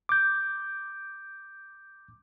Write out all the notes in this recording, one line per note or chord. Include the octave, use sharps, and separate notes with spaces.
D6 G6